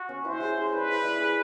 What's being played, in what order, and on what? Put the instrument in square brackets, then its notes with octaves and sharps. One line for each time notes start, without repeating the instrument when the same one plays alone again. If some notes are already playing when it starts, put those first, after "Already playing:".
Already playing: [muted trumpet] F#4
[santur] C#4
[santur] E4 [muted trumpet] C5
[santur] G#4
G#4
[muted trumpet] B4 [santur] D5
[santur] E4
D5
G#4